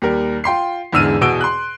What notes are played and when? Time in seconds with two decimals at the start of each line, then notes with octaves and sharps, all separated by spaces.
0.02 D#2 G3 A#4
0.44 F4 G5 C6 C7
0.93 E2 G#2 D3 E6 F6 D#7
1.21 E2 B2 F#4 E6 D7 G7
1.41 C6 F#6